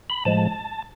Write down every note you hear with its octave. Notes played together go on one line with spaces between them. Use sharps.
B5
A2 F3 G#3 A5